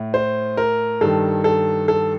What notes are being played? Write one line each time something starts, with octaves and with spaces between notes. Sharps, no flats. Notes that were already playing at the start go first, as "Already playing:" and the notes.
Already playing: A2
C5
A#4
G2 D#3 A4
A4
A4